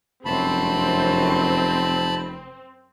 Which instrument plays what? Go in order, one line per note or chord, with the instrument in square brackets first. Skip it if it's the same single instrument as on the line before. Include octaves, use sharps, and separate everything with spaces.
[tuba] F1 [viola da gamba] F#2 [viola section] C4 [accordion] A5 B5